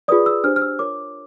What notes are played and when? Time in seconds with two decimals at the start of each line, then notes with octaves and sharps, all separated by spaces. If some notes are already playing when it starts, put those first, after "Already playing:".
0.08 F4 G#4 B4 D5 D#6
0.26 E6
0.44 D4 G4 C5 F6
0.56 F6
0.62 E6
0.79 D4 F4 A#4 C#5 D6